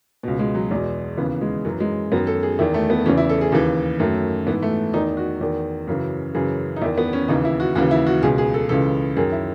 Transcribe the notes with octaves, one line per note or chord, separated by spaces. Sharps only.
C#2 B2
G#3
F#3
E2 B2 G#3
D#2 C#3 E3 B3
G#3
F#2 E3 F#3
G#3
F#2 D#3 B3
A4
G#4
E2 D#3 E4
A3
B3
E2 C#3 E3 C#4
E4
A4
G#4
D#2 C#3 E3
F#2 D#3 A3
G#2 E3 B3
A3
E2 D#3 D#4
F#4
E2 D#3
F#2 C#3 E3
F#2 C#3 E3 G#4
D#4
E2 D#3 E4
B3
C#4
D#2 C#3 E3 D#4
E4
F#4
D#2 C#3 E3 F#4
E4
F#4
C#2 B2 G#4
G#4
A4
C#2 C#3 E3 A4
F#2 D#3 G#4
E4